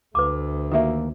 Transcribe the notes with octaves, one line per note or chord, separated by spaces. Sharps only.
D2 A3 B4 D6
D#3 A#3 F#4 E5